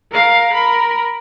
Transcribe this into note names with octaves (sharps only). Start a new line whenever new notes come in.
A#4 F5
A#4 B5